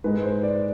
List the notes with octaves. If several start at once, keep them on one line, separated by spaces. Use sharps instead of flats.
G#2 G#3 B4
C5
D5